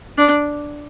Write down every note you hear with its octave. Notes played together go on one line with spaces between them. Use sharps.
D4